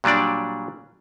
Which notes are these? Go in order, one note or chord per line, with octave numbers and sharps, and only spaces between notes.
A#2 F#3 G3 D4 D5